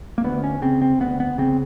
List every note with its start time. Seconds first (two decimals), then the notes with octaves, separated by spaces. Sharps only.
0.18 A#3
0.24 D2 B3
0.44 C#4
0.62 C#3 C4
0.82 C4
1.00 D2 B3
1.20 B3
1.38 C#3 C4